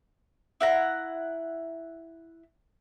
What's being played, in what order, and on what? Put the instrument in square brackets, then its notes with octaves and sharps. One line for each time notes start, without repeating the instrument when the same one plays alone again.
[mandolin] E4 F#5 A#5